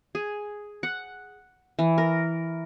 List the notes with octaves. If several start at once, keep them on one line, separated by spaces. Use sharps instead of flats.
G#4
F#5
E3
A#4